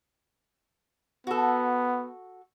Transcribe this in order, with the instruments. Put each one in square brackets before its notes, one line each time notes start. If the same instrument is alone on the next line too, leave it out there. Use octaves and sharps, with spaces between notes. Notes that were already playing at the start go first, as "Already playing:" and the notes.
[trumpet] B3 [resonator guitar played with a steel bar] F#4 A4